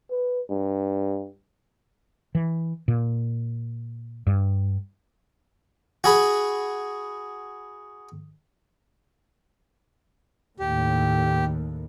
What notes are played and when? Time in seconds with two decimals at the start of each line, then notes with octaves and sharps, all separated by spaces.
0.11 B4
0.50 G2
2.35 E3
2.88 A#2
4.27 G2
6.04 F#4 G#4 B5
10.60 D#2 A2 G4